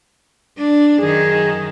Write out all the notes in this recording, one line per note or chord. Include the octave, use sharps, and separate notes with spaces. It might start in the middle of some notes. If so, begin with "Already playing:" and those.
D4
F#2 D#3 G#4